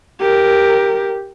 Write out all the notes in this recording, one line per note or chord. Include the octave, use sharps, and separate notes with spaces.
G4 A#4